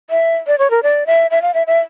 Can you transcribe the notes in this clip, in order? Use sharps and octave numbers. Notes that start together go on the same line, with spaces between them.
E5
D5
C#5
A#4
D5
E5
E5
F5
E5
E5